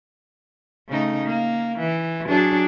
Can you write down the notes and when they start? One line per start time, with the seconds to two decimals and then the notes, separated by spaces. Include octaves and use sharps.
0.88 C#3 A3 D#4
1.25 A#3
1.79 E3
2.28 F#3 D4 G#4